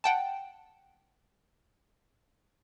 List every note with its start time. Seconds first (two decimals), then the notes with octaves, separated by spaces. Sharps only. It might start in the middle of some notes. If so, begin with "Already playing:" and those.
0.04 F#5 G5 A5